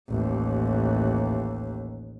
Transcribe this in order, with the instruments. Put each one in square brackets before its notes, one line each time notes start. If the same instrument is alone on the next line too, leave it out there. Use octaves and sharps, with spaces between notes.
[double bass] A1 D#2